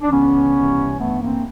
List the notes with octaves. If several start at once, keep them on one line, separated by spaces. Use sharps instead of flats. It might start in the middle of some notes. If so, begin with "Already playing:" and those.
D4
C#2 C#3 E3 B3 C#4
C2 C3 E3
G2 E3 A3 B3
A#3 C4